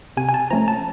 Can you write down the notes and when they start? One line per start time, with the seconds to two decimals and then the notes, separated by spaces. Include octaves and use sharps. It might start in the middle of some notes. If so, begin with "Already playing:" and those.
0.17 C3 G#5
0.29 G#5
0.34 A5
0.50 F3 A3 C#4 A#5
0.68 A5